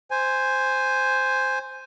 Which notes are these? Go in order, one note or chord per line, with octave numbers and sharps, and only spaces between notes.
C5 G#5